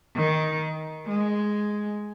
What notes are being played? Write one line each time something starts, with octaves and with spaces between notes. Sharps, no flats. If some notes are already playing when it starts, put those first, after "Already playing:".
D#3
G#3